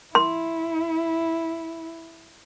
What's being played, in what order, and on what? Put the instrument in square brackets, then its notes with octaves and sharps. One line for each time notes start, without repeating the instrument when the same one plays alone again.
[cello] E4 [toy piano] C6